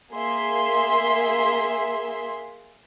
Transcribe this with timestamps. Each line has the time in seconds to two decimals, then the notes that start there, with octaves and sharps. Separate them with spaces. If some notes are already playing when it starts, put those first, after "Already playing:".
0.11 A#3 G#4 E5 C6